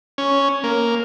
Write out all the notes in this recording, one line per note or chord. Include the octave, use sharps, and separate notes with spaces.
C#4
A#3